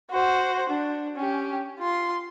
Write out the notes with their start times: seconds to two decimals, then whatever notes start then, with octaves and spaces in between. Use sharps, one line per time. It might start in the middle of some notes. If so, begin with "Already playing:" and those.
0.11 F#4 C5
0.69 D4
1.16 C#4 G4
1.79 F4 C6